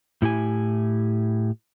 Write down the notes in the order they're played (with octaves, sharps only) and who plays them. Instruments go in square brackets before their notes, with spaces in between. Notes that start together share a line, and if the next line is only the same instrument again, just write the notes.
[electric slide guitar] A2 E4 G4 G#5